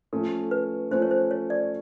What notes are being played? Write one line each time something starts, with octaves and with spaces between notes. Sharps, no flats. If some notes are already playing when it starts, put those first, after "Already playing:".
F3 A3 C#4 A4
B4
F3 A3 C#4 C5
C#5
C5
C#5
D5